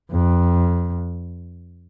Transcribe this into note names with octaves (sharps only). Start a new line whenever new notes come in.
F2